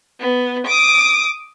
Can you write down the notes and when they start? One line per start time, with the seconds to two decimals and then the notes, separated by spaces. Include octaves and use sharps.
0.20 B3
0.67 D6 D#6